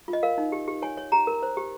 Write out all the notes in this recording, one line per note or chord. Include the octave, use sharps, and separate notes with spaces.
F4
D#5
A#4 F5
D#4
G4
G4
C#5 G#5
C#5
G4 A#5
A#4
C5
G4